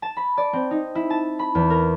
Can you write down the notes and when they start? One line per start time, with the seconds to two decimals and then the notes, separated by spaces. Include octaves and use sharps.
0.02 A5
0.17 B5
0.37 D5
0.53 C4
0.71 D#4
0.95 E4
1.10 A5
1.39 B5
1.55 E2
1.70 A#4